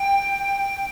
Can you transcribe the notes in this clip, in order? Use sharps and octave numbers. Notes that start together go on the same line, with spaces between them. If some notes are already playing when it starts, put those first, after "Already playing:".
Already playing: G5